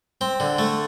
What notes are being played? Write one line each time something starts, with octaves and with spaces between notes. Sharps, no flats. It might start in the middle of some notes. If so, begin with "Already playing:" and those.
C4
D3
A3